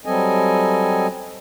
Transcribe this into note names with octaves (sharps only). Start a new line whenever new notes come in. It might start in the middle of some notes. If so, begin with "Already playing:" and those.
F#3 G3 C4 A4 D#5 G#5